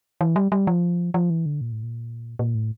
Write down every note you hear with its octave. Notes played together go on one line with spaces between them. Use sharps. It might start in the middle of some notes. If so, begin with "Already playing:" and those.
E3
G3
G3
F3
F3
E3
D3
A#2
A2
A#2
A#2
A2